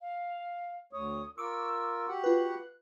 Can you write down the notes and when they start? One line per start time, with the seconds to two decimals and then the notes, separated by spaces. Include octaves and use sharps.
0.01 F5
0.93 D2 C#5 D#6
1.38 F4 A#4 C#6 D6 E6
2.09 F#4 G4 F#5
2.24 F4 B4 F#6